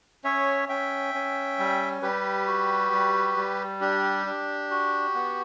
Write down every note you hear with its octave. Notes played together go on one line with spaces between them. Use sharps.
C#4 C#5 E5
C#4 E5 G5
C#4
G3
G3 G4 B4
F#4
G3
G3
D4 G4
D4
F#4
B3